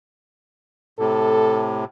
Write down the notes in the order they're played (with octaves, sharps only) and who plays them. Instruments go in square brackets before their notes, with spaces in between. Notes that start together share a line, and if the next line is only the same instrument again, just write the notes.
[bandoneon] A2 C3 [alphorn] A4